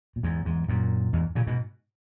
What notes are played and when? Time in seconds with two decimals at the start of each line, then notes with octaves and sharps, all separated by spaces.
0.16 A#2
0.23 E2 G#2
0.45 E2 G#2
0.69 F#2 A#2
1.13 E2 G#2
1.35 A#2 C#3
1.47 G#2 B2